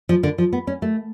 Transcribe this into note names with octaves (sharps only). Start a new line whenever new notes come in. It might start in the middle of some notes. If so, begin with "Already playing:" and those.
F3
D3
F3
B3
C#4
A3